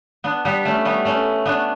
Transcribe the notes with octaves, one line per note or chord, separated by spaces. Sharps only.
B3 D4
G3 B3
A3 C#4
G3 B3
A3 C#4
B3 D4